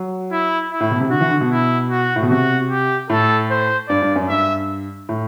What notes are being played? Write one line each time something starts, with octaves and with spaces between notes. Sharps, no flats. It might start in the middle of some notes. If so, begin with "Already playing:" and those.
Already playing: F#3
E4
E4
A2
B2
C3
D3 F#4
E3
D3
B2
E4
F#4
A2
B2
C3 F#4
G4
A2 A4
C5
G2 D5
G2
F#2
G2 E5
A2